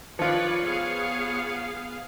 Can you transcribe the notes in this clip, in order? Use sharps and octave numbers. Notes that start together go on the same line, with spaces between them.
F3 F4 B4 C#5 D5
B3 G#4 F5